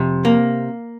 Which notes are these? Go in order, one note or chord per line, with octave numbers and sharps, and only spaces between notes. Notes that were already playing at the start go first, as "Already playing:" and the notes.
Already playing: F2 C3
A#3